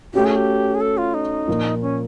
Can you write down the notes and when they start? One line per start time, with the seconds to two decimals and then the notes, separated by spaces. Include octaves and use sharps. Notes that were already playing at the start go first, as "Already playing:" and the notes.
0.14 A3 C#4 F#4 G4
0.25 G#4
0.36 G4
0.75 G#4
0.81 A4
0.98 F4
1.14 D#4
1.48 A#2 F3 A#3
1.82 C#4